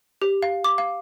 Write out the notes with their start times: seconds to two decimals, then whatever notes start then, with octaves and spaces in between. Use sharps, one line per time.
0.22 G4
0.43 F5
0.64 D6
0.78 F5